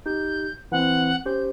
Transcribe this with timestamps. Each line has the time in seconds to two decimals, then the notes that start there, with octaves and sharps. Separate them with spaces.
0.06 D#4 G4 G6
0.72 E3 C4 F#5
1.26 C#4 G4 C5 G6